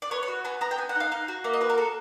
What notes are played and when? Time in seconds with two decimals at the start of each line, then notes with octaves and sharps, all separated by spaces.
0.02 D5
0.11 B3 C#5
0.23 C#5
0.28 F#4
0.45 B3 G#5
0.61 B3 A#5
0.71 G5
0.78 B3 G#5
0.89 F#5
0.95 D#4
1.00 F5
1.12 D#4 F5
1.28 F#4
1.44 A#3 E5
1.53 D#5
1.61 F#4 B4
1.70 A#4
1.77 F#4 A4